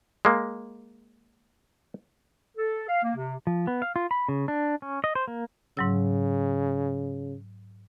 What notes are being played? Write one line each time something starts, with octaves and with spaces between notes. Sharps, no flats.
G#3 A#3
A4
F5
A#3
C3
F3
B3
F5
F4
B5
C#3
D4
C#4
D#5
C5
A#3
G#2 C#3 F#3 E6